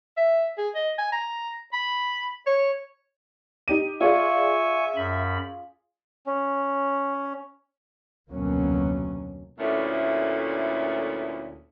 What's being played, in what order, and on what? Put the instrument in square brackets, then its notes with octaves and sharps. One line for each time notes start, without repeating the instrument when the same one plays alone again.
[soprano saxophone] E5
G#4
D#5
G#5
A#5
B5
C#5
[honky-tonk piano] D#4 G4 D#7
[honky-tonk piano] F4 G#4 D5 [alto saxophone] E5 [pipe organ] G#5 C#6
[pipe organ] F#2 B5
[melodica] C#4
[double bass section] F1 D2 B2 F#3 A#3 C#4
[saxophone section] D2 A#2 A3 B3 C#4 E4